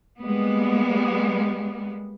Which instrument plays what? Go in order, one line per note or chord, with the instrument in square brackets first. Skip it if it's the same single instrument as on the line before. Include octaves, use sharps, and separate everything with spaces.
[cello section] G3 G#3 A#3 B3